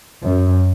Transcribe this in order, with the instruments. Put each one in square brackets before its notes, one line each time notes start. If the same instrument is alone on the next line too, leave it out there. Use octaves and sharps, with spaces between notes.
[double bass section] F#2